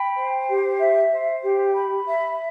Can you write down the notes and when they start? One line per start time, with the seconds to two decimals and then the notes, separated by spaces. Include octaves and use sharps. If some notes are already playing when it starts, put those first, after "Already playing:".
Already playing: G5 B5
0.15 C5
0.47 G4
0.79 E5
1.10 C5
1.43 G4
1.74 B5
2.06 E5